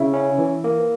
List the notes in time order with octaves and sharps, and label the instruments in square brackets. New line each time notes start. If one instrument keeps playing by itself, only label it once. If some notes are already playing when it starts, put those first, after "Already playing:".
Already playing: [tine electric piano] C#3 [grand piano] E4
[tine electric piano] C#4
E3
A#3